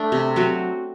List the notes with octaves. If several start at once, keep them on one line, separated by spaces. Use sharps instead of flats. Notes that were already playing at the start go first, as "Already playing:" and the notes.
Already playing: A3 D4
C3
F#3 C4 F#4